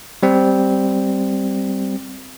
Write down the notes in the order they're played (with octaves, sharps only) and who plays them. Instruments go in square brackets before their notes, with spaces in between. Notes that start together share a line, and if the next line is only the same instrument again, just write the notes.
[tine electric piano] G3 C4